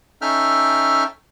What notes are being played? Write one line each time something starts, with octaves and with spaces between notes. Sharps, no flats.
C#4 D#4 A4 E5 G5 F6